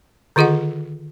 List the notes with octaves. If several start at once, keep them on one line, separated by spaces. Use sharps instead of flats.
D3 D#3 F4 G#4 D#5 F#5